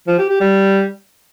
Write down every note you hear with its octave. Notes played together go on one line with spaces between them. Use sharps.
F3
G4
G4
G3